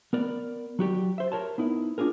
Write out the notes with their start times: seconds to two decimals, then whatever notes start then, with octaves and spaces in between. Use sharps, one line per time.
0.13 B3 A#4 D5
0.79 F#3 F#4 G4 D5
1.18 C5 E5
1.32 A#4 C#5 A5
1.58 B3 D#4 E4
1.98 C4 D4 F4 G#4 A#4